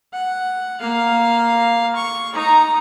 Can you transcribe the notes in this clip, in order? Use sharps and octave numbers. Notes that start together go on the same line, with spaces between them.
F#5
A#3 F5
C#6
D#4 A#5